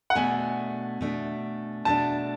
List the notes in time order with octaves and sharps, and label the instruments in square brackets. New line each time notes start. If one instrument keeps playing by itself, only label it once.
[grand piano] F#5
[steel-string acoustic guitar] B2 A3 D4 [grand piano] G#5
[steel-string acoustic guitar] B2 A3 D4
[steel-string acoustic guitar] B2 A3 D4 [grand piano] A5